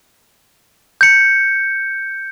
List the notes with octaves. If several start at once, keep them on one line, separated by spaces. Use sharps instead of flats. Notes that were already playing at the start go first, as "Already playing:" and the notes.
G6 C#7